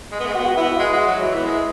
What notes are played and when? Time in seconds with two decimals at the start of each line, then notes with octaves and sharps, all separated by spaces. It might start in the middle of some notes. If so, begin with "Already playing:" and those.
0.12 G#3
0.20 B3
0.26 G#3
0.34 B3 F#4
0.46 F#4
0.57 B3 E4
0.67 E4
0.78 G#3 F#4
0.93 G#3
1.07 F#3
1.22 E3 E4
1.35 B3
1.44 G#3